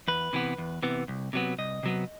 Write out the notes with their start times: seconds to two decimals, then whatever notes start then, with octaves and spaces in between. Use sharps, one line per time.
0.08 E2 B4
0.33 C3 E3 B3
0.58 E2
0.83 C3 E3 B3
1.08 C2
1.33 C3 F#3 B3
1.58 C2 D#5
1.83 C3 F#3 B3